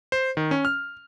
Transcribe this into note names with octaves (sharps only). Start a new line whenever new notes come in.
C5
D#3
C#4
F6